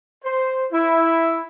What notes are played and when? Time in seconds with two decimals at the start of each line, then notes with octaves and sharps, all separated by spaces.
0.25 C5
0.73 E4